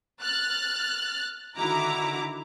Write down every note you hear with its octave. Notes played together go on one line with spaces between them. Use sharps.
F6 F#6 A6
D3 D#3 E4 F#4 A#5 D6